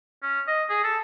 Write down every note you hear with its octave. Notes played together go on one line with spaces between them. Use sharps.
C#4
D#5
G#4
A4